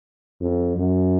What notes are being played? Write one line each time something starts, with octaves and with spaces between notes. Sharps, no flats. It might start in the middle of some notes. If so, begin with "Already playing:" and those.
F2
F#2